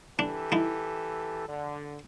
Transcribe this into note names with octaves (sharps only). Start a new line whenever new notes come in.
E3 D4 G4 A4
D#4 E4
D3